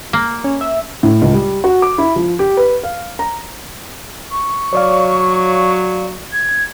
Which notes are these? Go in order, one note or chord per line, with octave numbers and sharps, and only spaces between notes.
A#3
C#4
E5
A2
C#2
G3
F#4
D6
E4
F3
G4
B4
F5
A#5
C#6
F#3 C#5 D5 F5
G#6